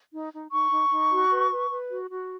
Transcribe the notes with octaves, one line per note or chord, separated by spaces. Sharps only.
D#4
D#4
D#4 C#6
D#4
D#4
F#4
B4
B4
B4
F#4
F#4